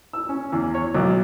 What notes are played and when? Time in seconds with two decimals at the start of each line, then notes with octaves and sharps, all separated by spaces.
0.13 E6
0.29 C#4
0.52 E2
0.74 C#5
0.95 B1